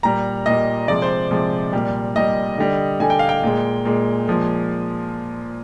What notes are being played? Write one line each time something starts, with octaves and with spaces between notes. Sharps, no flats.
A#2 G3 A#5
A#2 G3 D#5
C3 F3 G#3 D5
C5
C3 F3 G#3
A#2 G3
A#2 G3 D#5
D3 G3
D3 G3 G#5
G5
F5
G5
A#2 G#3
A#2 G#3
A#2 F3 G#3